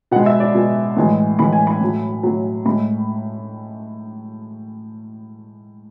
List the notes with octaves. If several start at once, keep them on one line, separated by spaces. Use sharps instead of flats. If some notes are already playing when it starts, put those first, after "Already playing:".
B2 G#3 F#5
E5
D5
B2 G#3
A2 E3 G#3
A2 E3 G#3 B5
G#5
B5
A2 F#3
A2 F#3
A2 G#3 B5